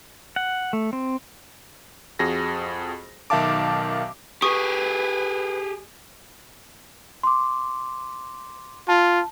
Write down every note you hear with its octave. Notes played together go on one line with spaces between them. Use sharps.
F#5
A3
C4
F2 F#4 G#4 A#6
B1 D#3 E5 F5 A5 D6
G4 G#4 B4 C#6 D#6
C6 D6
F4 A5